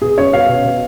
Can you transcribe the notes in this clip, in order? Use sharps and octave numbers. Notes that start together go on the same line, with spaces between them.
B2 G#4
C#4 C#5
B2 F5
B2
B2